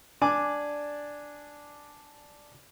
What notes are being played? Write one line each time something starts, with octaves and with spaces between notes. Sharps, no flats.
D4 D5 G#5 D6